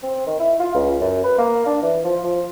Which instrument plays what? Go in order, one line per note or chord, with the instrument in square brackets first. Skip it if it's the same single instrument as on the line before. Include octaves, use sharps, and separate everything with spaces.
[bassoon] C4
D#3
E4
F4
C#2
F#2
B4
A#3
D4
E3
F3
F3